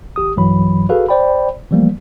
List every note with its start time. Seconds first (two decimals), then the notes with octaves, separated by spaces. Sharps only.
0.16 G#1 G4 D#6
0.36 B1 G2 E3 F#3 B5
0.89 F#4 G#4 A4 B4 F5
1.09 C5 D5 G5 B5
1.71 E3 F3 G3 A3 A#3